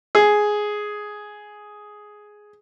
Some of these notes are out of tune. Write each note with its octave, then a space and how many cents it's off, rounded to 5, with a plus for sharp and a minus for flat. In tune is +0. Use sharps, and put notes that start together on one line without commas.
G#4 +5